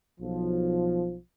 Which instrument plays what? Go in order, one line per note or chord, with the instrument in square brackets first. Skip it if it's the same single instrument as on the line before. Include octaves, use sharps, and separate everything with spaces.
[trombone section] B1 F3